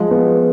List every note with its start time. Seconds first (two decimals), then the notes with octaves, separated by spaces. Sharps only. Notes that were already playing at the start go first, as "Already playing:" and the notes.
Already playing: F3 G#3
0.11 B3